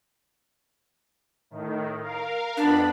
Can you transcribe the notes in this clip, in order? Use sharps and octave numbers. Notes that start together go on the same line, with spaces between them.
A2 D#3
A#4 F5
F2 B3 D4 B5